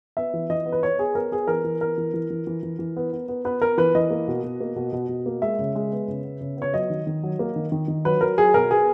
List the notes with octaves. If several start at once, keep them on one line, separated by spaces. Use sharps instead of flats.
B3 E5
E3
E3 D#5
B3
B4
B3 C#5
B3 G#4
B3 A#4
B3 G#4
E3 A#4
E3
B3 A#4
E3
E3
E3
E3
E3
E3
B3
B3
B3
B3 B4
B3 A#4
E3 B4
E3 D#5
A#3
B2
B2
A#3
B2
B2
B2
A#3
G#3 E5
C#3
G#3
B3
C#3
B3
C#3
B3 C#5
F#3 D#5
D#3
D#3
F#3
A#3
D#3
D#3
D#3
F#3 B4
F#3 A#4
F#3 G#4
B2 A#4
B3 G#4